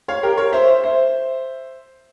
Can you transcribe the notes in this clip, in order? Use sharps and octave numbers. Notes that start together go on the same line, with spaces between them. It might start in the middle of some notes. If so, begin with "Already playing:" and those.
C#5 F5
G4 A#4
A#4 C#5
C5 E5
C5 E5
C5 E5